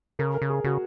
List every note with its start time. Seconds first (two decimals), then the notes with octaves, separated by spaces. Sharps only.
0.19 C#3 A#4
0.34 A#4
0.42 C#3
0.50 G#4
0.64 C#3 F#4